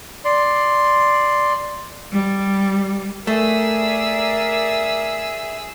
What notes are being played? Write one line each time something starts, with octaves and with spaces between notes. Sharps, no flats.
D5 C6
G3
A3 G#4 A#4 D5 E5 E6